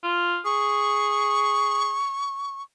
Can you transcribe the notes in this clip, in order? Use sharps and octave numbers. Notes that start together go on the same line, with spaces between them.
F4
G#4 C#6